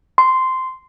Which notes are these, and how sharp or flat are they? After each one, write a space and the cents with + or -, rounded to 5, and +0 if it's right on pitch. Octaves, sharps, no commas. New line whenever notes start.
C6 -10